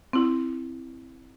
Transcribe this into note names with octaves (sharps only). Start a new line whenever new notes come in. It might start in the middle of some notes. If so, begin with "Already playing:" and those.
C4 E4